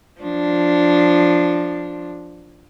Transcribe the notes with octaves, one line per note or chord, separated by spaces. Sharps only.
F3 D4